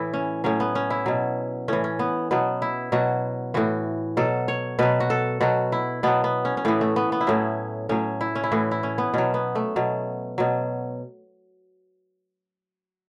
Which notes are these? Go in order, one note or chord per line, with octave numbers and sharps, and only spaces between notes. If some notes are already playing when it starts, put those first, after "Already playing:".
Already playing: A2 E3 E4
C#4
A2 F#3 C#4
B3
C#4
E4
B2 F#3
A2 E3 C#4
C#4
B3
B2 F#3 B3
E4
B2 F#3 F#4
A2 E3 F#4
B2 F#3 A4
C#5
B2 F#3 B4
F#4
A4
B2 F#3 F#4
E4
B2 F#3 B3
B3
C#4
C#4
A2 E3 B3
A3
B3
B3
E4
A2 F#3 C#4
A2 F#3 C#4
E4
C#4
E4
A2 E3 F#4
E4
C#4
B3
B2 F#3 C#4
B3
A3
B2 F#3
B2 F#3